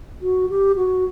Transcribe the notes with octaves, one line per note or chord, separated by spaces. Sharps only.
F#4
G4
F#4